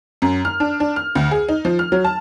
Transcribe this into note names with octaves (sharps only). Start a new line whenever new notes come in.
F#2
F6
D4
D4
F6
D2
G#4
D#4
F3
F6
F#3
A5